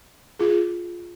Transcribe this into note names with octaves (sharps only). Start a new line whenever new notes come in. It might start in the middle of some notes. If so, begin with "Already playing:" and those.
F4 G#4